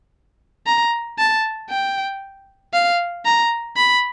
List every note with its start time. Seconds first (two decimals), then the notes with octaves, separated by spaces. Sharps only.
0.67 A#5
1.18 A5
1.70 G5
2.74 F5
3.26 A#5
3.77 B5